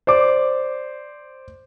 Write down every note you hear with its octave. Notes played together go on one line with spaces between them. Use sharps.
C5 D5 D6